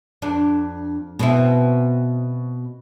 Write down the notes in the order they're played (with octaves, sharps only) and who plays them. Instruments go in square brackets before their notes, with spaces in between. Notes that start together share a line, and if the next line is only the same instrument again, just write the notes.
[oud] F2 D4
B2 C4 E4